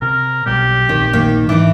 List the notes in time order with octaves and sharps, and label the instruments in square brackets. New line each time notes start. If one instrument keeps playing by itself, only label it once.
[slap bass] C3 [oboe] A#4
[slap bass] B1 B2 G3 [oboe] G4
[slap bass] A#1 D#2 C4 [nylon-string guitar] D#3
[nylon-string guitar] D#3 A#3 D#4
[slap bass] G#2 D4 [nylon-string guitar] E3 D#4 [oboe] D6